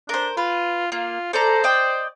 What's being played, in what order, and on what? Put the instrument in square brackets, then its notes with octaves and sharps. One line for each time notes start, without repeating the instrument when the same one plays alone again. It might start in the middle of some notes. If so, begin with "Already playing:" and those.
[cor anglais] D4 [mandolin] A#4 C5
[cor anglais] F4 [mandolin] B4
[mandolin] A#3 [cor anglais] F4
[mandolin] A4 D5 A#5 [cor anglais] C5
[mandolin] D5 D#5 G5